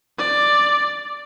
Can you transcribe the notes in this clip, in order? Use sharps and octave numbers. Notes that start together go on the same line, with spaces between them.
D5